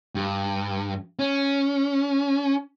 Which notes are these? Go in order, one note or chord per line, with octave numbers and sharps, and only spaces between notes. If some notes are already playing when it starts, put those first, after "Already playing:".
G2
C#4